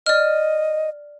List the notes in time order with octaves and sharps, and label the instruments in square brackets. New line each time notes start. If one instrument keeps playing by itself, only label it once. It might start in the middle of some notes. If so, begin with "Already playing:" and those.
[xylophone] D5 F6 [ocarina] D#5